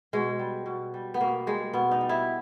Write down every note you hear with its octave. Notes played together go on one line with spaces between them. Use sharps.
B2 G#3
G3
B2
G3
B3
B2 A#3
G3 G#3
B2 B3
D#4
G3
E4